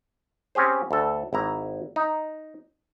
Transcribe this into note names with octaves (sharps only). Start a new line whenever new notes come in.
C4 C#4 G4 G#4 C5
D2 A4
G#1 E4 A#5
D#4